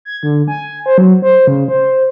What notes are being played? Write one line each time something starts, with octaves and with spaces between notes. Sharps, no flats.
G#6
D3
G#5
C5
F#3
C5
C#3
C5